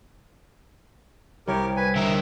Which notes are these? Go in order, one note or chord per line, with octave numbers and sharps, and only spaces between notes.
C2 G4 A#4 C#5
B4 G#5
D3 A#4 E5